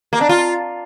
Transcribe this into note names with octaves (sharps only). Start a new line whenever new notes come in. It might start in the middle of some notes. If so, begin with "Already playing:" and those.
A#3
D4
F4